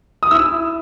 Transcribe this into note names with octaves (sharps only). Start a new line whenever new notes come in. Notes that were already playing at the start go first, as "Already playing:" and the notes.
D#6
E4 E6